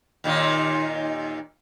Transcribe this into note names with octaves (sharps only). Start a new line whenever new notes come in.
D#2 A#2 D#3